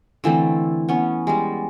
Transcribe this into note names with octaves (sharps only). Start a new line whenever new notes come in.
D3 E3 A3 C4
B3 C#4
G3 G#3